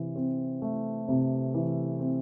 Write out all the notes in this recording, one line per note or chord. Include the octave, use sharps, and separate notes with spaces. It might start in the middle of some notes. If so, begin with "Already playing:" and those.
Already playing: C3 E3
C4
A3
C3
E3
C4